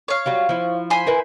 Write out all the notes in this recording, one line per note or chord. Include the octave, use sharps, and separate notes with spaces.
C#5 F5
F#3 G3 F4
F3 E4
C5 G#5 B5
E4 A#4 B4